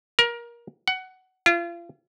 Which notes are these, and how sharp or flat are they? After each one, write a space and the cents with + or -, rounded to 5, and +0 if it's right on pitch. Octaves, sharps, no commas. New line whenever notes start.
A#4 +20
F#5 +15
F4 -35